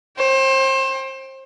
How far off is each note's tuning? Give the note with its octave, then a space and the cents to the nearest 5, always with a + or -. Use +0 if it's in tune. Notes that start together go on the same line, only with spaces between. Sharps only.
C5 +30 G5 +0